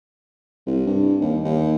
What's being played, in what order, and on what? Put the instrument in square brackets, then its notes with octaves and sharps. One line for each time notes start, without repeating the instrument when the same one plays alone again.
[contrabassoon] C2
G2
D#2
D#2